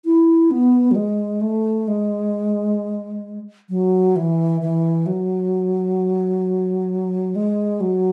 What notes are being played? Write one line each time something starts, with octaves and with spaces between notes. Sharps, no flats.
E4
B3
F#3
G#3
A3
G#3
F#3
E3
E3
F#3
G#3
F#3